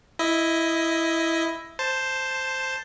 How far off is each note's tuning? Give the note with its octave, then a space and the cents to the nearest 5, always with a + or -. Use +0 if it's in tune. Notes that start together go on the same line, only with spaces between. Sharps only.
E4 +0 D#5 +15
C5 +0 A5 +5